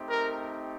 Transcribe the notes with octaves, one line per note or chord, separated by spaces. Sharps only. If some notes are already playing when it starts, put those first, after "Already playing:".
Already playing: A3 C4 D#4 G4
A#4